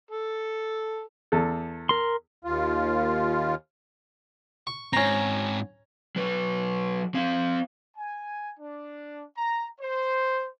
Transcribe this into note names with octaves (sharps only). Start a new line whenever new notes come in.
A4
E2 A4
A#4 C6
D#2 F4
C#6
G#2 C4 C#4 A#5
F#3 B4
C4 F5
G#5
D4
A#5
C5